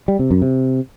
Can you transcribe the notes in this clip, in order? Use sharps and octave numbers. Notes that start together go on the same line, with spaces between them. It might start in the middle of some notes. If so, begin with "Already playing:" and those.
G3
C3
F#2
C3